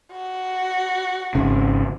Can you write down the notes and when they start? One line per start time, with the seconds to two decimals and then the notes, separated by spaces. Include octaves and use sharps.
0.12 F#4
1.35 G#1 C#3